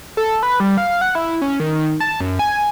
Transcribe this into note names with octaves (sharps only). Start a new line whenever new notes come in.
A4
B4
G3
F5
F#5
E4
C#4
D#3
A5
F#2
G#5